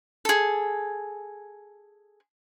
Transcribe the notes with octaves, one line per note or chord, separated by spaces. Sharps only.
G#4 A4